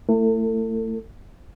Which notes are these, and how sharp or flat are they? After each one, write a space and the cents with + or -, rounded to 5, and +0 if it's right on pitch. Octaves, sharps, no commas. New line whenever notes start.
A3 +25 E4 +25 A4 +40